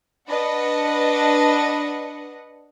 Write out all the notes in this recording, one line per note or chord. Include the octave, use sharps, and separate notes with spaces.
D4 B4 D#5 F#5